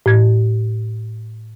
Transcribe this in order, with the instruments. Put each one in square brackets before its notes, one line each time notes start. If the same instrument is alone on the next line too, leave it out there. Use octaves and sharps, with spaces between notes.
[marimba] A2 G#6